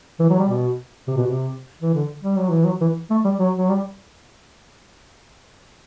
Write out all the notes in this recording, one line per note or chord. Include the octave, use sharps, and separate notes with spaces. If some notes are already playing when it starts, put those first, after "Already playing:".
E3
F#3
G3
B2
C3
B2
C3
E3
D3
G3
F#3
E3
F#3
E3
A3
G3
F#3
F#3
G3